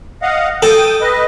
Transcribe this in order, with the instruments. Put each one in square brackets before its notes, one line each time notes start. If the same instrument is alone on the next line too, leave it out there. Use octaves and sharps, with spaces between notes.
[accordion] D#5 F5 F#5
[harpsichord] A4 [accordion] G5 D#6
[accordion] B4 D#5